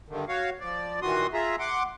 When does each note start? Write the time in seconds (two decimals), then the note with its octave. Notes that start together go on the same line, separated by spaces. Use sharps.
0.09 G2 D3 D#3
0.28 F#4 C#5 F5
0.60 F3 D5
1.02 A#2 D#3 E3 F#4 C6 D#6
1.34 F4 G#4 E5 A#5
1.59 F#5 C6 D6